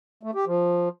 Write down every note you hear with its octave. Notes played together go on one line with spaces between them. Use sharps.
A3
G4
F3